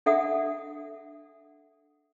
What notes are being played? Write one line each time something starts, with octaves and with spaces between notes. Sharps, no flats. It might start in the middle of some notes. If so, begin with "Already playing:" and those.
D4 A4 E5 F#5 D#6